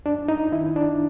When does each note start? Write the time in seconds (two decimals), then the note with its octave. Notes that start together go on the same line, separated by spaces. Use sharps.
0.05 F#2 D4
0.28 D#4
0.52 D#3 E4
0.76 D4